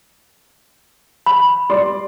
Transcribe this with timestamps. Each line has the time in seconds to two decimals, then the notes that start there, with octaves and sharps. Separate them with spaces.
1.26 B5
1.70 G3 D5 C6